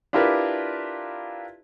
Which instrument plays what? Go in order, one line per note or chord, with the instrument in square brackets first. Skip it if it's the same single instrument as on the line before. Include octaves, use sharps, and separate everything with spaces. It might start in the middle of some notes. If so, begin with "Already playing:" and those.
[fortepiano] D4 E4 F4 G4 A#4 B4